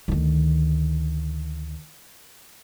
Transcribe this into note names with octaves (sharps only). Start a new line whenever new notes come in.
D2 D#3